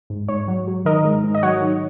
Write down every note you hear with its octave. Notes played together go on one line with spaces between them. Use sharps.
G#2
G#2 C#5
F#3
F#3
D#3 A#4 D#5
G#2
G#2
D#5
F#3 C#5 F#5
D#3